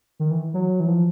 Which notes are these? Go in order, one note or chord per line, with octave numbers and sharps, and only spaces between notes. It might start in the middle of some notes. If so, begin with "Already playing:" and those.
D#3
E3
F#3
E3
F3